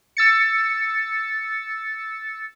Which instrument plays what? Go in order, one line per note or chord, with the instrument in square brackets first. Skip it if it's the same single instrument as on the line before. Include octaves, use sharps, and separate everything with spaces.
[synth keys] E6 A6 C#7